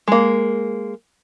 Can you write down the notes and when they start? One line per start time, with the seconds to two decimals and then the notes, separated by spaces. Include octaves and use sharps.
0.08 G#3 A#3